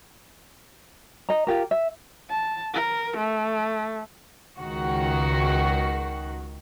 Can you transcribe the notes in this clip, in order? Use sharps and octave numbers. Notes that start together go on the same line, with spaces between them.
D#5 A#5
F4 G4 A#4
E5
A5
A#4
A3
C#2 D#3 F#4